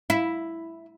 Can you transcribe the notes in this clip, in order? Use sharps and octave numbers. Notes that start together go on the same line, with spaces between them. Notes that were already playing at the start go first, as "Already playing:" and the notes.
E4